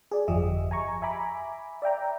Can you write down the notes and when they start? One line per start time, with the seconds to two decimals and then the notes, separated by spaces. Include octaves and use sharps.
0.11 G#4 D5
0.28 G1 F2 F3 G4 D#5 E5
0.71 G#5 A#5 C#6
1.02 E5 G#5 A#5 B5 D6
1.82 D5 E5 G5 A#5